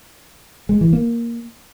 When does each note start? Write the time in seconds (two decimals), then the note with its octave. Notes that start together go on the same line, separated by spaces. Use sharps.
0.69 G#3
0.81 E3
0.93 A#3